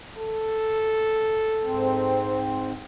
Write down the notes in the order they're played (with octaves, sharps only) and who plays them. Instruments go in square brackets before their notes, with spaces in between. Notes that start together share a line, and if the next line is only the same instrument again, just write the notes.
[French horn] A4
[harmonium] G#2 C4